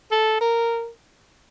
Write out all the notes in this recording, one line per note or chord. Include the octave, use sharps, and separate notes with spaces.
A4
A#4